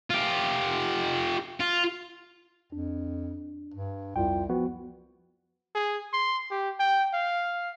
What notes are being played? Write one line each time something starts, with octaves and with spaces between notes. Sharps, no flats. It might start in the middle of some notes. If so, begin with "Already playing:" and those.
F4 G4
F4
F2 D4
G2
C2 F2 F4 G5
F3 B3 F#4
G#4
C6
G4
G5
F5